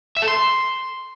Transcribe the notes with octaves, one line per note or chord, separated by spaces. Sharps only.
E5
A4
C6